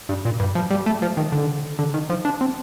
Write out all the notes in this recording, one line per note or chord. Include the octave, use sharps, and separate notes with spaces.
G2
A#2
G2
F3
G3
A3
F3
D#3
D3
D3
D#3
F3
D4
C4